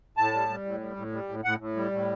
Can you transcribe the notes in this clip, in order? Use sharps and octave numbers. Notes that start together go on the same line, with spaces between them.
A2 A5
G3
G3
A2
G3
A2
G3
A2
A2 F#5
A2
G3
A2